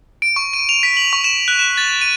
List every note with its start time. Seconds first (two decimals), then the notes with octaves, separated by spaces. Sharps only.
0.22 D7
0.36 C#6
0.53 D#7
0.69 F7
0.83 B6
0.97 F#7
1.13 C#6
1.24 E7
1.48 F#6
1.59 E7
1.77 A6
2.01 D#7